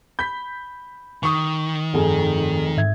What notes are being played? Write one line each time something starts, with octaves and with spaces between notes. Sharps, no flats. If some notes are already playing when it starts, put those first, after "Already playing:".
B5 G6 B6
D#3 C#6 D#6
F1 G2 G#4
G#2 E5 G#6